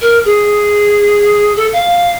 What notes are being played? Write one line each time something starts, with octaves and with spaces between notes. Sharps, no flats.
A#4
G#4
A4
F5